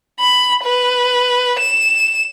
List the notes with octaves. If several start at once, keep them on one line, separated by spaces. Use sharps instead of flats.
B5
B4
E7